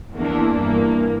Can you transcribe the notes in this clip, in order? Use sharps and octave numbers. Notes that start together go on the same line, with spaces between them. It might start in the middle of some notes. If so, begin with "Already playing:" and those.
E2 E3 A#3 D4
G2 E3 A#3